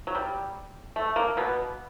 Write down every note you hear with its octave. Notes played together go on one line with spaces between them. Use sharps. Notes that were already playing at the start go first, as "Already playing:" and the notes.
F#3
G3
A3
A#3
B2 B3